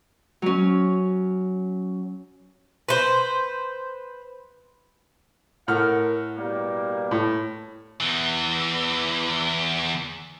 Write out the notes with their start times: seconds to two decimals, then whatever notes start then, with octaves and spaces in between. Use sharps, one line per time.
0.42 F#3 C#4
2.89 B4 C5
5.68 A2 A#4 F#5 F6
6.37 B2 G3 A#3
7.11 A2
8.00 E2 E3